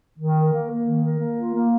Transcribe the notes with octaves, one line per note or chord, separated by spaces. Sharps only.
D#3
A#4
A#3
A#3
D#3
A#4
A#3
F4
A#3